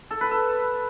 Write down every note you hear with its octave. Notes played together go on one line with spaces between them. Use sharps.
A4
B4
A4